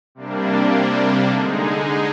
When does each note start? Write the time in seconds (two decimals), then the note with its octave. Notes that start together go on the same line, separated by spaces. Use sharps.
0.15 C3 G3 A#3 D4
1.31 D3 G#3 D#4 G#4